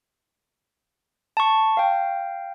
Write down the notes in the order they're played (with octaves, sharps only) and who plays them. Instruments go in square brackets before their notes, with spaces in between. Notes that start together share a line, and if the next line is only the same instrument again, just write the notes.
[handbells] A5 C#6
F5 G5